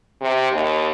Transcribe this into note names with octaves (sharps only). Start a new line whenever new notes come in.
C3
D#2